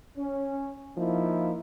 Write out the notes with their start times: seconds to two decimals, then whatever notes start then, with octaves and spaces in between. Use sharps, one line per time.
0.18 C#4
0.97 F3 A#3 D#4 E4